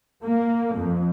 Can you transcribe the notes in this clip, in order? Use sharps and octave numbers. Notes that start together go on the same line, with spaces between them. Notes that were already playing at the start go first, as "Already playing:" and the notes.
A#3
F2